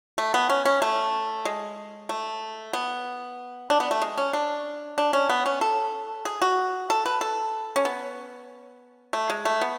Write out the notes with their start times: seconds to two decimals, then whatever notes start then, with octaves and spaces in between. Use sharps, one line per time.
0.18 A3
0.34 B3
0.50 C#4
0.65 C#4
0.82 A3
1.45 G#3
2.09 A3
2.73 B3
3.70 D4
3.80 B3
3.91 A3
4.02 G#3
4.18 C#4
4.33 D4
4.98 D4
5.13 C#4
5.29 B3
5.46 C#4
5.61 A4
6.25 G#4
6.42 F#4
6.90 A4
7.06 B4
7.21 A4
7.76 C#4
7.85 B3
9.13 A3
9.30 G#3
9.45 A3
9.61 B3